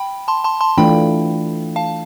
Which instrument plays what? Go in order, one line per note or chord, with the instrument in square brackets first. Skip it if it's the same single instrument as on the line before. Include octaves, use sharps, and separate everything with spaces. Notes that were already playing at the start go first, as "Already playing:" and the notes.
Already playing: [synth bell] G5 B5
A5 C6
A5 C6
A5 C6
[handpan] E3 A3 D4 F4 [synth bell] G5 B5
[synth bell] F5 A5